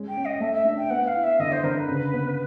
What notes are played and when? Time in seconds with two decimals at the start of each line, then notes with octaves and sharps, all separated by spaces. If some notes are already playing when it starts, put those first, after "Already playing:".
Already playing: G#3 C#4
0.08 G5
0.17 C#4
0.25 D#5
0.40 A3 E5
0.53 E5
0.65 D4
0.77 G5
0.90 B3 F#5
1.07 F5
1.15 E4
1.23 E5
1.39 D3 D#5
1.52 C5
1.63 D3 A#4
1.76 B4
1.89 C#3
2.13 B3